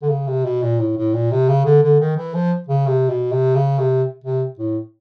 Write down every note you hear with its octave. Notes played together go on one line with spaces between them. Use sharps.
D3
C#3
C3
B2
A#2
A2
A2
A#2
C3
C#3
D3
D3
D#3
E3
F3
C#3
C3
B2
C3
C#3
C3
C3
A2